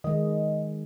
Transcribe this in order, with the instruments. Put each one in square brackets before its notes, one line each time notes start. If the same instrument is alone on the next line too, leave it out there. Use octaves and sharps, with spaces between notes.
[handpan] D#3 G#3 [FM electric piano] D#5